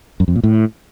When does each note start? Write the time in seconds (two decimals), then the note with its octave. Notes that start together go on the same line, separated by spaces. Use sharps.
0.20 F#2
0.28 F2
0.36 A#2
0.44 A2